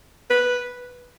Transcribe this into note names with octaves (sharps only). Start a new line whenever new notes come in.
B4